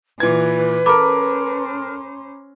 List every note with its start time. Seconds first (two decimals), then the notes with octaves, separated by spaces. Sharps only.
0.20 A#2 E3 B4 G#6
0.86 C#4 A4 A#4 C5 A#5 B5 D6